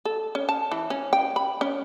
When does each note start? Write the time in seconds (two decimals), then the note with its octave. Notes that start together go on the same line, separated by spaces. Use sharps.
0.05 A4
0.35 C#4
0.49 A5
0.72 E3
0.90 C#4
1.13 G5
1.36 B5
1.61 C#4